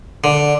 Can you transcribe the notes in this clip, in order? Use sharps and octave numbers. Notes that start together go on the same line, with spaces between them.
D3